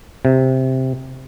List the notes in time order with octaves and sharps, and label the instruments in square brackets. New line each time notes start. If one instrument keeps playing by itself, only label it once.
[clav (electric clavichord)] C3